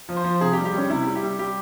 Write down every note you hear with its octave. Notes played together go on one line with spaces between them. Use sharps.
F3
C5
F3
C3 G#4
G4
G3
G4
G3 C#4
C3 E4
G3
G4
G3
G3 G4